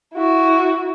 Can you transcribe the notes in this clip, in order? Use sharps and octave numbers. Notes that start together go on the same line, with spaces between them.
E4 F#4